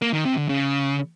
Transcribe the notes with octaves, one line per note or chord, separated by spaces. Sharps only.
A#3
D#3
C3
D3
C#3